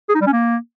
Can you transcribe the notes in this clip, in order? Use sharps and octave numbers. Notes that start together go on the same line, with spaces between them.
G#4
D#4
G3
C#4
A#3